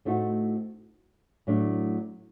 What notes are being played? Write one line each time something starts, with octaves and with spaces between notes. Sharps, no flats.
A2 A3 C4 D#4 F#4
A2 F#3 A3 D4